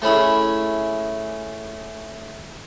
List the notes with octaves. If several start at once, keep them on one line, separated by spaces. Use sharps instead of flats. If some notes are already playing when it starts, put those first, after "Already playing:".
A3 C#4 E4 G#4